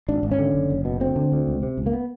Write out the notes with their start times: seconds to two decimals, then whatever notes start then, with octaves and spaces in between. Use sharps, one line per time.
0.08 G#1 D4
0.23 G#1
0.31 C#4
0.39 D3
0.55 F#1
0.70 F#1
0.85 B2
1.00 D2 C4
1.16 D3
1.32 D2
1.47 C#2
1.63 C3
1.78 C#2
1.86 A#3
1.93 B3